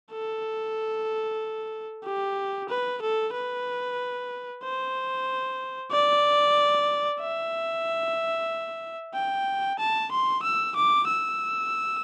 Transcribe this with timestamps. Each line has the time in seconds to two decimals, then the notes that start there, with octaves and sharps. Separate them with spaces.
0.12 A4
2.05 G4
2.69 B4
3.02 A4
3.34 B4
4.63 C5
5.91 D5
7.21 E5
9.14 G5
9.79 A5
10.11 C6
10.43 E6
10.76 D6
11.08 E6